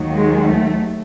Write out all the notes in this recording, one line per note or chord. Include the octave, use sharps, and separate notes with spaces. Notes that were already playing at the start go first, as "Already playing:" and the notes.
Already playing: D#2 D#3 F#3
G#3
A3